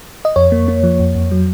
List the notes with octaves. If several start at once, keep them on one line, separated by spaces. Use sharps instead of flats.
D#5
F2 C#5
A#3
A#3
F3
F2
F2
F#3